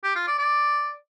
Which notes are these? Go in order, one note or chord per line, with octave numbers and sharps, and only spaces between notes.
G4
F4
D5
D5